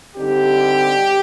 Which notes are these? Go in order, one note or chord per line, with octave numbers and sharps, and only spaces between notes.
D3 G3 C4 D#4 G4